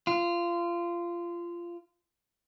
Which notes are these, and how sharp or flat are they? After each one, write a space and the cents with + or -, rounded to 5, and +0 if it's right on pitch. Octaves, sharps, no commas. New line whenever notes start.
F4 -20